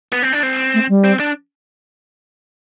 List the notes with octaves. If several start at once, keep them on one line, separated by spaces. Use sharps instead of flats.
B3
C4
D4
C4
A3
G3
C4
D4